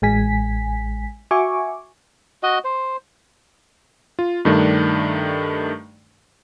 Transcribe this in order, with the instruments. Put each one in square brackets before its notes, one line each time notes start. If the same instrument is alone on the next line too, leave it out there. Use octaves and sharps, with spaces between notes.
[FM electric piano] A1 G#3 G#5 B6
F#4 E5 G#5 C#6 D6
[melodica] F#4 D#5
C5
[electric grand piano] F4
G2 D#3 A3 D4